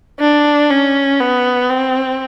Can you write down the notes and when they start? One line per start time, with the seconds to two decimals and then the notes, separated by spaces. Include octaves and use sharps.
0.19 D4
0.70 C#4
1.20 B3
1.69 C4